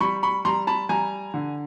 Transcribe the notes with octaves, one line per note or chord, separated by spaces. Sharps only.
G3 B5 C#6
B5 C#6
G3 A#5 C6
A5 B5
G3 G#5 A#5
D3